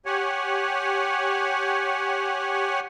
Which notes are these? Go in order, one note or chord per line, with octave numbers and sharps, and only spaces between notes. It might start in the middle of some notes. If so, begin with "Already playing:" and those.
G4 C#5 F#5 G#5